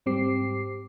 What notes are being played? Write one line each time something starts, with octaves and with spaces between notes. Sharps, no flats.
G#2 G3 C4 G4 D6 C7